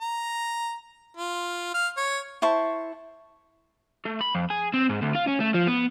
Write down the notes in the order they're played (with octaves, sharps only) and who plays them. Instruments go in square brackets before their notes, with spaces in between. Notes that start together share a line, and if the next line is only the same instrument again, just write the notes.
[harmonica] A#5
F4
F5
C#5
[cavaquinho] E4 C5 A5 C#6
[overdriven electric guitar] A3
B5
F2
G#4
C4
G#2
D2
F4
C#4
A3
F3
B3